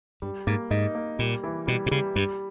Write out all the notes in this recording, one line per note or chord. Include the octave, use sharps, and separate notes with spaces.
G2 G3
G#2 A#3
G#2 D#4
A#3
A#2 G3
E3
B2 G3
B2
C#3 G3
G2 G3